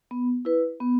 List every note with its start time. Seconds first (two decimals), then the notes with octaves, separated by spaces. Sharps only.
0.11 B3
0.45 E4 B4
0.80 B3